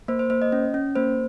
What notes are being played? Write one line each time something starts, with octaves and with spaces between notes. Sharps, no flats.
A#3 C5
C5
A#3 C5
D#5
C#4
C#4
A#3 C5